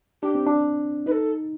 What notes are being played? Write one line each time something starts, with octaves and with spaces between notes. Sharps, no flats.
D4 G4
C4
D4
D#4 B4
A4